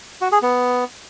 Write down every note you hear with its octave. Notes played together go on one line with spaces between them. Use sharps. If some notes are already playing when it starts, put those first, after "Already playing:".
F#4
G#4
B3